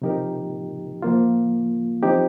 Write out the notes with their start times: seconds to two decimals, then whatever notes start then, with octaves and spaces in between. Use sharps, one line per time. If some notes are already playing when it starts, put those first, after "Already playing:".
0.02 C3 F3 D#4 G4 A#4
1.02 F3 A#3 F4
2.03 F3 C4 D#4 G4